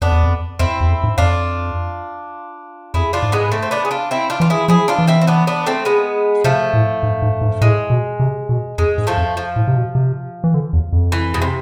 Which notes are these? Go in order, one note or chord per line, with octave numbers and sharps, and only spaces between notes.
F2 B3 D4
E2
F2
F2 C4 E4
E2
F2
G#2
F2 D4 F4
F2 E4 G#4
D4 F4
G#2
G#3 B3
A3 C4
C4
B3 D4
G#4
D4 F4
C4 E4
D4 F4
E3 F4
E4 G#4
F3 E4 G#4
D4 F4
E3
C4 E4
C4
B3 D4
B3 D4
A3 C4
G#3 B3
C3 F3 A3
A2
G#2
G#2
G#2
A2 G#3
B2
C3
B2
F2 G#3
G#2
F3 A3
F2
F3
A2
C3
B2
C3
E3
D3
E2
F2
E3
B2
C3